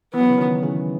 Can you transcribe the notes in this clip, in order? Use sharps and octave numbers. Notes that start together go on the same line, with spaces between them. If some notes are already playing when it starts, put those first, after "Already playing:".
E3 B3
F#3
C#3 E3
D#3 F#3
C#3 E3